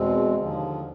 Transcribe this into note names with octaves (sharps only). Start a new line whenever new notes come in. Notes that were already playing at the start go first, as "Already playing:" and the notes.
Already playing: E2 B2 G#3 C4
D#2 D3 F3